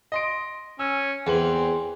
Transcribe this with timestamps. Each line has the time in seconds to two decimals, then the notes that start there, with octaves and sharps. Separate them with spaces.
0.12 D#5 C6 D7
0.79 C#4 E6
1.27 E2 E3 C4 F#7